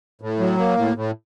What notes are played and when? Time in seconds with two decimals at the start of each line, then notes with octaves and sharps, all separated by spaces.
0.21 A2
0.40 F#3
0.58 A#3
0.77 A2
0.96 A2